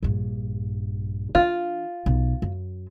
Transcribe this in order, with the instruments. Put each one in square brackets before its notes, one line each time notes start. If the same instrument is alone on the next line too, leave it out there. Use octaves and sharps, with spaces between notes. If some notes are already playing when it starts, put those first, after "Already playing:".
[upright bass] A#1 G2
[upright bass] E3 D4 [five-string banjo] F4
[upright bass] B1
F#2